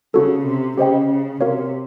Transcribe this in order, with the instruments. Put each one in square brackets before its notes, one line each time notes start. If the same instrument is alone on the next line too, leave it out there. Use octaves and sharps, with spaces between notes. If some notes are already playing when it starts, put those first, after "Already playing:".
[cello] C#3 [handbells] C#4 F#4 A4
[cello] C3
[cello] C#3 [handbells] G4 C5 D#5 G5
[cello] C#3
[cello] C3 [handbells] F#4 A#4 C#5 F5